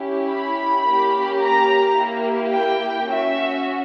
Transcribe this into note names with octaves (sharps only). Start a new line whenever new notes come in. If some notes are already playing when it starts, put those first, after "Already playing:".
Already playing: C#4 E4 G4
B5
A#3 C#4 G4
A#5
A#3 E4 G4
G5
C#4 F#4 E5